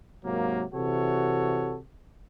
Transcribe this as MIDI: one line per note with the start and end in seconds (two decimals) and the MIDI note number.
0.25 0.64 44
0.25 0.64 48
0.25 0.64 54
0.25 0.64 58
0.74 1.77 48
0.74 1.77 52
0.74 1.77 66
0.74 1.77 69
0.74 1.77 73